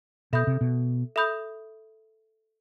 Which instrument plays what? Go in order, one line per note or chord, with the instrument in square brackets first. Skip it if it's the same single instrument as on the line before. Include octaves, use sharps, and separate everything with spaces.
[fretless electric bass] B2 [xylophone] A4 E5 B5 D#6 G6
[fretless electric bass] C3
B2
[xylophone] A4 E5 B5 D#6 G6